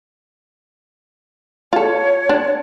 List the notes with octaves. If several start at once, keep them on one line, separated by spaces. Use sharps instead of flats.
F4 A4 C#5
D4